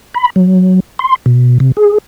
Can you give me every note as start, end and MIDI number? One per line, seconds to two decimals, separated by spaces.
0.14 0.30 83
0.36 0.80 54
0.99 1.16 84
1.26 1.58 47
1.60 1.72 48
1.77 1.98 68